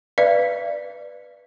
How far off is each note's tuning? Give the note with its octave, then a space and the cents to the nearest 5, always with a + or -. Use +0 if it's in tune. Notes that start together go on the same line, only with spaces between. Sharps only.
B4 +0 D5 +15 F5 -40